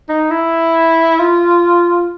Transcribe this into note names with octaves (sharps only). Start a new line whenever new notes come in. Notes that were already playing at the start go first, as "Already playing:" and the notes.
D#4
E4
F4